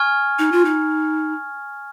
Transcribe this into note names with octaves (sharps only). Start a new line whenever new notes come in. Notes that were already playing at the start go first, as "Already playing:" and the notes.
Already playing: G#5 C#6 F6 G#6
D#4
F4
D#4